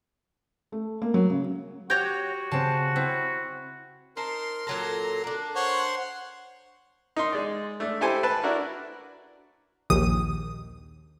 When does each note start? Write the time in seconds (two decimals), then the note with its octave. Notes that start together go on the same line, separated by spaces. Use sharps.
0.72 A3
1.02 A#3
1.14 F#3
1.30 C#3
1.90 F#4 G4 C#5 G6 A#6
2.51 C#3 C4 A5
2.96 C4 E4
4.17 D#4 A#4 C5 A5 C6
4.67 A#2 F#3 A4 A#5 C6
5.24 A#3 D4
5.55 C5 C#5 F#5 C6
7.16 D#4 A#4 C6
7.32 G#3 D5
7.80 A3 D4
8.01 E4 G4 A4 C5 G#5 C6
8.23 B4 A5
8.43 D4 E4 F#4 A#4
9.90 A#1 D#2 D#6